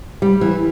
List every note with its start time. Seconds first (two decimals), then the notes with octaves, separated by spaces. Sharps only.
0.22 G3
0.41 E3